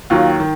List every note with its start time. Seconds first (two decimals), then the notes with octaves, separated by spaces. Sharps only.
0.10 D#2 D#3 F#3 F4
0.40 D#3